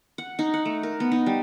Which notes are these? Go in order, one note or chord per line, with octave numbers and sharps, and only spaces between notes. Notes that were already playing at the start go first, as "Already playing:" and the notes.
F#5
D#4
F#5
A3
A#4
B3
D#4
G3